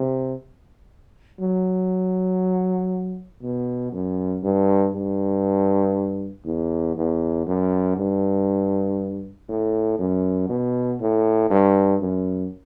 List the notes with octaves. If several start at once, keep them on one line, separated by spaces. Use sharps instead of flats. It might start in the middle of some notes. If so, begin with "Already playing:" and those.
Already playing: C3
F#3
B2
F#2
G2
G2
E2
E2
F#2
G2
A2
F#2
B2
A2
G2
F#2